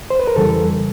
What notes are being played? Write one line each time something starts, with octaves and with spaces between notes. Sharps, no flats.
C5
B4
A#4
F2 C#3 E3 G3 A4